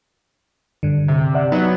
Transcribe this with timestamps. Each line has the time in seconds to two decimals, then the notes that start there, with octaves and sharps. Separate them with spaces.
0.83 G2 D3
1.08 C3
1.35 D5 E5 F#5
1.52 F#3 B3 D#4